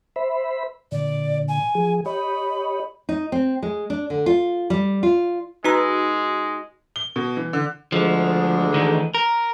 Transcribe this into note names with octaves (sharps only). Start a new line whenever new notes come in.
C5 E5 B5
A#2 D3 D5
G#5
F3 G#4
G4 C#5 D#5 B5
D#4
C4
G#3
D4
D3
F4
G3
F4
G#3 D#4 F#4 B4 A#5 E6
G7
B2
E3
D3
D2 D3 F3 G#3
D#3 E3
A#4